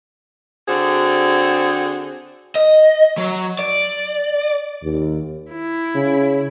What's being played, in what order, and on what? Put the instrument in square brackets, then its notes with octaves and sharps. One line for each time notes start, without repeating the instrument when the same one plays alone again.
[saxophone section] D3 C4 F#4 G#4
[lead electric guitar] D#5
F#3
D5
[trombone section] D#2
[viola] E4
[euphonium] C#3